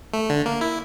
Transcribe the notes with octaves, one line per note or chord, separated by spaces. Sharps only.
A3
D3
A#3
E4